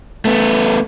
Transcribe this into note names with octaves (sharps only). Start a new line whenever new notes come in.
A3 B3